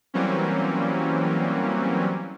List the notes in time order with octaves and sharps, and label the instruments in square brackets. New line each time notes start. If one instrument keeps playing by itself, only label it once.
[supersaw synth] E3 F#3 G3 A#3 C4 C#4